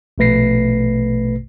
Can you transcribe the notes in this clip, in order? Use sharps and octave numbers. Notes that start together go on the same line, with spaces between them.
A#1 B2 A3 B4 A#6 C7